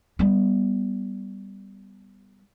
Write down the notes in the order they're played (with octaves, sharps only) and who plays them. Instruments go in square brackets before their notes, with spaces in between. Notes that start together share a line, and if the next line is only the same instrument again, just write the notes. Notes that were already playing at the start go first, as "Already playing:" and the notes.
[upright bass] G3 B3